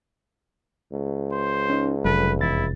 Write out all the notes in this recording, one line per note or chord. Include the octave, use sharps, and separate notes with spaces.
C#2
C5
C#4 D#4
F1 F#3 A4 B4
E2 E4 A6